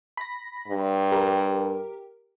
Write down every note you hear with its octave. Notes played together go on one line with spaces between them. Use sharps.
B5 A#6
G2
G4 A#4